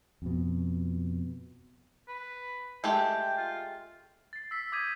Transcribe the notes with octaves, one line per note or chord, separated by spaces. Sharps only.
F2 B2
B4
G#3 A3 G4 G5
F4
A6 C7
E6 B6
D6 D#6 G6 G#6 B6 D#7